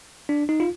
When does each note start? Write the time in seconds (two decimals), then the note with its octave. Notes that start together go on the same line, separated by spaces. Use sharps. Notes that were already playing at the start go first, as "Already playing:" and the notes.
0.29 D4
0.49 D#4
0.60 F4